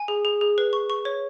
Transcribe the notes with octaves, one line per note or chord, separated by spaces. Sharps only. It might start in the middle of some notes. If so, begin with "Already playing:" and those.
Already playing: G#5
G#4
G#4
G#4
B4
C#6
C#6
C#5